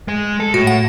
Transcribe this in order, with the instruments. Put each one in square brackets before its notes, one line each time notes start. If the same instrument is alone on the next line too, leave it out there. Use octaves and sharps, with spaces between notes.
[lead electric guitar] G#3
A4
[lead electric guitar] A2 [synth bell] F#4
[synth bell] F#5